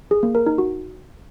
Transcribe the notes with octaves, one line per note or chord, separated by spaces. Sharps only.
G#4
A#3
A#4
D#4
F#4